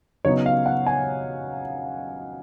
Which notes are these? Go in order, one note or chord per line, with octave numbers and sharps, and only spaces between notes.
C#3 F#3 B3 D#4 C#5
F5
F#5
G#5